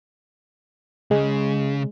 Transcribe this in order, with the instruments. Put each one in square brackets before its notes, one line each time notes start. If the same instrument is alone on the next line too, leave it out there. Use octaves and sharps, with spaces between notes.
[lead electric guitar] C#3 [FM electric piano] G#3